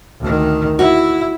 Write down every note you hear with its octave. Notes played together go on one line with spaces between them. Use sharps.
D2 D#3
E4 F#4